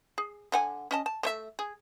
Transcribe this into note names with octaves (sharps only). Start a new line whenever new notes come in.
G#4
D3 F#5 G#5
C#4 D#5 A5
A5
A3 C5 E5
G#4